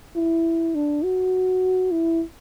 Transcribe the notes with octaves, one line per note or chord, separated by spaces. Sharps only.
E4
D4
F#4
E4